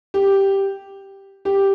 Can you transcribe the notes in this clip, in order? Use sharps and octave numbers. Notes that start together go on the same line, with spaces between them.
G4
G4